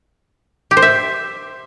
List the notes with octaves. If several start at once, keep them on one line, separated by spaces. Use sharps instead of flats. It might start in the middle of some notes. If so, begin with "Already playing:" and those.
G4
C5
E5